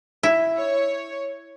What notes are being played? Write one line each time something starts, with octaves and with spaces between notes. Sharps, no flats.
E4
C#5